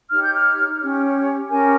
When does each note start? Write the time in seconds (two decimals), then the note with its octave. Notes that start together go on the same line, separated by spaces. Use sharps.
0.10 D#4 G4 C#5 F6
0.23 G6
0.33 F6
0.80 C#4 G4 C#5
1.50 C#4 G4 A#4 C#5 G#5